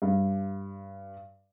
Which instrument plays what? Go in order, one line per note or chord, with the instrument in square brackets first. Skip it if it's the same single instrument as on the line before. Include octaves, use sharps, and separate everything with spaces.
[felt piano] G2